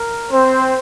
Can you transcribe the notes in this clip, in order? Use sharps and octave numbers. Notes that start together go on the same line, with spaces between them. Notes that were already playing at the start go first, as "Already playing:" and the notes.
Already playing: A#4
C4 C5